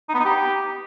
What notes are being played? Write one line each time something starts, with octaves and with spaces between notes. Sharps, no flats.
D#4
B3
D#4
G4